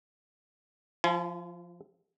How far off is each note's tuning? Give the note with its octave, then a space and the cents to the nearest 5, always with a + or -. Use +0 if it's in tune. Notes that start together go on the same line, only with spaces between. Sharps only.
F3 +0 F4 -45 G#5 +35